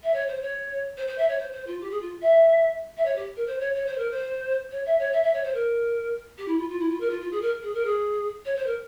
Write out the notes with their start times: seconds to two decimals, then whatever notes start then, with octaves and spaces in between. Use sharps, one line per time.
0.03 E5
0.13 C#5
0.27 C5
0.42 C#5
0.97 C5
1.07 C5
1.17 E5
1.28 C#5
1.39 C5
1.52 C5
1.67 F4
1.80 G4
1.91 G#4
2.01 F4
2.21 E5
2.97 E5
3.05 C#5
3.15 G4
3.36 A#4
3.46 C5
3.60 C#5
3.74 C#5
3.86 C5
3.97 A#4
4.10 C5
4.71 C#5
4.85 E5
4.99 C#5
5.12 E5
5.23 E5
5.33 C#5
5.43 C5
5.54 A#4
6.37 G4
6.48 E4
6.58 F4
6.68 F4
6.79 E4
6.89 F4
7.00 A#4
7.10 F4
7.20 F4
7.31 G#4
7.41 A#4
7.62 G#4
7.74 A#4
7.85 G#4
8.45 C#5
8.56 C5
8.66 A#4